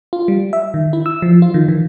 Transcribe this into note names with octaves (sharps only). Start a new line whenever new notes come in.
F4
G3
E5
D#3
E4
E6
F3
F4
D#3
E3